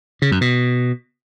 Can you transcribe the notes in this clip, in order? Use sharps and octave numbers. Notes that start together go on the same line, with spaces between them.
C#3
F#2
B2